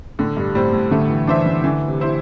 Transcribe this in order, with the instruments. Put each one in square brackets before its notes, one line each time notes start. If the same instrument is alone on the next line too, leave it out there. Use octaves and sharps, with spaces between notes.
[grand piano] A2 [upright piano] D3
[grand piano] G2
[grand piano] A2 [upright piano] G3 C4
[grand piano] A2
[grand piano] D3 [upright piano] A3
[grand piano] E3
[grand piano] E3 [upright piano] D4 C5 E5
[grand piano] D3
[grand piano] D3 [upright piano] E3
[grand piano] C3
[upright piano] C4 E4 C5